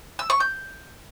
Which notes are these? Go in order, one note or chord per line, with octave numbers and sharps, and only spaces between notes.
E6
C#6
G6